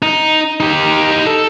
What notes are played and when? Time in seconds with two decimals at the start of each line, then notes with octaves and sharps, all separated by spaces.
0.02 D#4
0.60 D#4 G4
1.27 A4